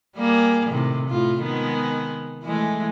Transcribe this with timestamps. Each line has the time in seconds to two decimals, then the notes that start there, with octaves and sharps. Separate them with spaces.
0.16 G3 A#3 G#4
0.69 A2 C3 D#3
1.09 A2 F4
1.42 D#3 G#3 B3
2.43 E3 G#3 A3